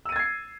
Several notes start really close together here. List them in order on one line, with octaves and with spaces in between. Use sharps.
E6 D#7 A6 G#6 C7